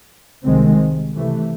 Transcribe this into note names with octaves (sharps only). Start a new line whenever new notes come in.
C2 C3 D#3 G#3 C4
C3 E3 A3